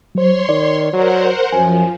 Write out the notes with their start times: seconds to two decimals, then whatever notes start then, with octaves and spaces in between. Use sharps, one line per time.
0.15 F#3 C5 C#5 C6
0.49 D#3 D5
0.93 F#3 A#4 C5 F#5
1.52 F#2 F3 G#5